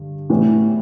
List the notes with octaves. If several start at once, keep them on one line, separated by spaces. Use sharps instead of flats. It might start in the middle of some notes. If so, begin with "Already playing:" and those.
Already playing: G2 D3
A2 E3 G3 B3